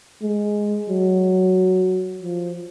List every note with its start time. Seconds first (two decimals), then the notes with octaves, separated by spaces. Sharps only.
0.23 G#3
0.90 F#3
2.21 F3